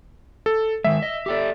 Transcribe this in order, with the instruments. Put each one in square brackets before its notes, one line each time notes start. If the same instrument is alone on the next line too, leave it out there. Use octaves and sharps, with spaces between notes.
[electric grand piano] A4
[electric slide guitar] D#3 G#3 [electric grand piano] E5
[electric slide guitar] D#5
G4 A4 D5